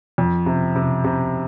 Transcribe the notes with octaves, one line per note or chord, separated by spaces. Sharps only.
F2
C3
C3
C3